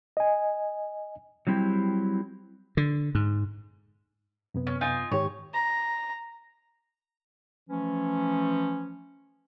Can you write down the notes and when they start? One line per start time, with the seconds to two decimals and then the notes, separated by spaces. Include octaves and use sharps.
0.17 D#5 G#5
1.47 F#3 G3 C4 E4 G4
2.77 D3
3.15 G#2
4.54 F#2 C3 B3
4.67 C#4
4.81 D#4 F4 G#5
5.11 G#2 D#3 G4 C#5
5.54 A#5
7.69 E3 F3 A3 C#4